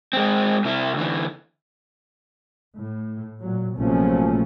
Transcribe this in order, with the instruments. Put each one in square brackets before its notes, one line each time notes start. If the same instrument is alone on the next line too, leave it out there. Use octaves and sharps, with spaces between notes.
[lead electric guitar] G#3 C4
C3 E4
D2 E3
[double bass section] A2
A#2 F#3
A#1 C3 F3 F#3 A3 C#4